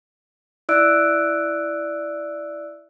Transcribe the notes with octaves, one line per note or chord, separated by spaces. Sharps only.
E4 D5 E5 E6 F#6 D7